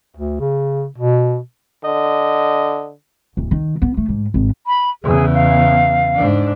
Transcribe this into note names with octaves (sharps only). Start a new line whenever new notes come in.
D2
C#3
B2
D3 D#5
D1
D#3
B3
A3
G#2
G#1
B5
E2 C#3 G#4
F5
G#2 D4